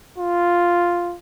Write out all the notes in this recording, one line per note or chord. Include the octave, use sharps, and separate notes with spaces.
F4